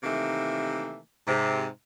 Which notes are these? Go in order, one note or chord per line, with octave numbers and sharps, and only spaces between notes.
C3 D#3 E3 A3 A#3
G#2 C3